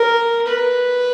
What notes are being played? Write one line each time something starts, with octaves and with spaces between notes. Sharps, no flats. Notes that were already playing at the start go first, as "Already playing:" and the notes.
Already playing: A#4
B4